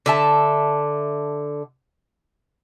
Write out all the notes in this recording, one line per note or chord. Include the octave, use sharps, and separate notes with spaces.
D3 E5 A5